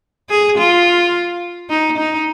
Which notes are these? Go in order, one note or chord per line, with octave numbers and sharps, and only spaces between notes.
G#4
F4
D#4
D#4